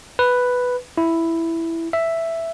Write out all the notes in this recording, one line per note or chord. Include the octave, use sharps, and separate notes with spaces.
B4
E4
E5